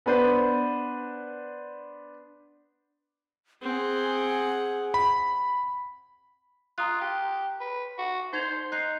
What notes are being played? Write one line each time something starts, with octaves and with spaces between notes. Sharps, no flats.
B3 D4 B4 C5
C4 G#4 F#5
B5
F4 A#5 D#6 F#6
G4 F#6
B4
F#4
D#4 C5 G#6 F7
D#4 F#6 G6 C7